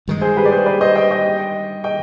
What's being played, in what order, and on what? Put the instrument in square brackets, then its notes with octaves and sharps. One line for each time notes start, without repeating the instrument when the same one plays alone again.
[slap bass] G2 D#3 G#3
[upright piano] G#4 C5
G4 B4
D5
G#4 C5
B4 D5
C5 D#5
D#5 G5
D#5 G5
D#5 G5